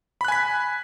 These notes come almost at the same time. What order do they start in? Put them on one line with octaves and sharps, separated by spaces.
B5 F#6 G#5 B6